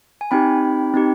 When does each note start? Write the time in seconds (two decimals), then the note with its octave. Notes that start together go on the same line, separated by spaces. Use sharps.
0.21 G#5
0.31 C4 D#4 G4 G5 B5
0.94 C4 D#4 G4